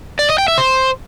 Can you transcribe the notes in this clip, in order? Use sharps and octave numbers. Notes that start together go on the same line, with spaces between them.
D5
D#5
G5
E5
C5